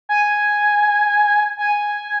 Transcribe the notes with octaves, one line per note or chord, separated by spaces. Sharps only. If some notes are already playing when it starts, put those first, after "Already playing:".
G#5
G#5